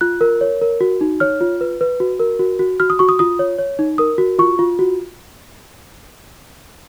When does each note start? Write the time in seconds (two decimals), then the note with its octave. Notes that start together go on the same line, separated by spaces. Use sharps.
0.01 F4 F#6
0.21 A#4
0.41 C#5
0.61 A#4
0.81 F#4
1.01 D#4
1.20 C#5 F6
1.41 F4
1.61 B4
1.81 B4
2.00 F#4
2.20 A#4
2.39 F#4
2.59 F#4
2.80 F#4 F6
2.90 D#6
2.99 F#4 C#6
3.09 D#6
3.19 F4 D#6
3.39 C#5
3.58 C#5
3.79 D#4
3.98 A#4 D#6
4.18 F#4
4.39 F4 C#6
4.59 F4
4.79 F#4